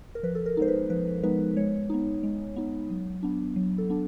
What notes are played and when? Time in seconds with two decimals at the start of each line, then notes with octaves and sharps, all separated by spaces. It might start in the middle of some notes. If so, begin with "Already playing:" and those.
0.15 A#4
0.23 F3 B4
0.35 A4
0.46 A#4
0.57 G#3 B3 D#4 C5
0.68 B4
0.90 F3 B4
1.23 G#3 B3 D#4 B4
1.56 G#3 C#5
1.90 B3 D#4
2.23 G#3
2.56 B3 D#4
2.90 F#3
3.23 B3 D4
3.56 F#3
3.78 A4
3.90 B3 D4